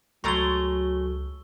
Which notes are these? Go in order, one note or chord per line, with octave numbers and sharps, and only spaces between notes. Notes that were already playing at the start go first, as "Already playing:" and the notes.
C#2 F#3 G#3 A3 A#5 C#6 E6 G7